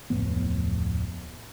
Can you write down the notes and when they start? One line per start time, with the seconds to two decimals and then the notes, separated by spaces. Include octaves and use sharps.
0.10 D1 F2 A2 B3